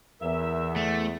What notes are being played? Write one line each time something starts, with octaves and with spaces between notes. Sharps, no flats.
E2 A#4 E5
A3